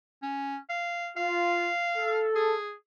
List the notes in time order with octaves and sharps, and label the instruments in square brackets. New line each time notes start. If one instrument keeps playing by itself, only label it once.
[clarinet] C#4
F5
[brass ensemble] F4 [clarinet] F5
[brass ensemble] A4
[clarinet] G#4